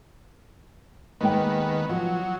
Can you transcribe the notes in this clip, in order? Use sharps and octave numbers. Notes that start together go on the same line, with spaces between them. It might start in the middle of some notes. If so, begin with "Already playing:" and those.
D#2 D#3 G#3 B3 G5
F3 F#3